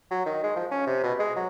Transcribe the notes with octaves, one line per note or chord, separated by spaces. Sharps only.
F#3
D#3
G#3
F3
C#4
C3
B2
G#3
F#3